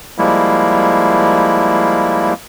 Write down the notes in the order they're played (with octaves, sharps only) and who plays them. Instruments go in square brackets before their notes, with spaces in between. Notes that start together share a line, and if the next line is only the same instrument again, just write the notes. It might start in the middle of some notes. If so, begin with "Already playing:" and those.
[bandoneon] F3 G3 G#3 A#3 E4